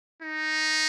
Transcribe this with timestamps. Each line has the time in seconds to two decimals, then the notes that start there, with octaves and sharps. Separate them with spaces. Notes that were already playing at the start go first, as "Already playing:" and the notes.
0.22 D#4